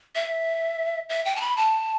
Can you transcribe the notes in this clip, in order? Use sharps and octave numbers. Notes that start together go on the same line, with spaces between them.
E5
E5
G5
A5
B5
A5